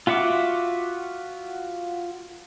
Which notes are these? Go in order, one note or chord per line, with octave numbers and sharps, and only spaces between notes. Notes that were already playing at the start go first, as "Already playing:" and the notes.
F4 F#4 E5 F#5 D6